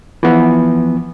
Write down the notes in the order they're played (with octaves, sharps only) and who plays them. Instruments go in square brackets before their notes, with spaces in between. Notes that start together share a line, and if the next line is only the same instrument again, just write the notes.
[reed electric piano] E3 F3 B3